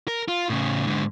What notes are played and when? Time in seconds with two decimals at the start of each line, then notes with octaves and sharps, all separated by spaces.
0.08 A#4
0.28 F4
0.50 A2 C#3
0.87 G#2 D3